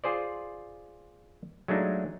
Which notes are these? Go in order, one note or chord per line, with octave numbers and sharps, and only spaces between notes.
F4 G#4 C5 D5
F#3 G#3 A3 D4 D#4 F4